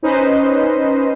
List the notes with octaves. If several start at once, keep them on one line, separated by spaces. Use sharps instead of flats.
C#4 D#4 B4 C5 D#5